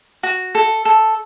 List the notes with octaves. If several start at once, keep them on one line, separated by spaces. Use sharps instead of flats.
F#4
A4
A4